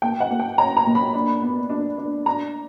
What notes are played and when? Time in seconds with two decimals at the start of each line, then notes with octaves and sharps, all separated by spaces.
0.02 A#3 G5
0.20 F#5
0.30 A#3
0.39 G5
0.58 C#4 A#5
0.77 A#5
0.86 A#2
0.95 B5
1.14 D4
1.42 B3
1.70 D4
1.98 D4
2.26 D4 A#5